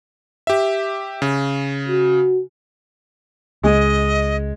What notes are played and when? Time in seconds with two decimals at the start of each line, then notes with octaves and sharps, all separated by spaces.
0.47 G4 E5
1.22 C#3
1.89 F#4
3.63 C#2 G#3 D#5